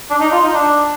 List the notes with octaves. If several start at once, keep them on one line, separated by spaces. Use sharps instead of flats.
D4
D#4
F4
D#4
D4